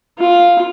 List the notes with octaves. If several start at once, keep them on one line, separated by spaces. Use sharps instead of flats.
F4